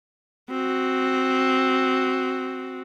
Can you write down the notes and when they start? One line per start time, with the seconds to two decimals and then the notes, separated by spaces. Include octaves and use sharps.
0.50 C4 F#4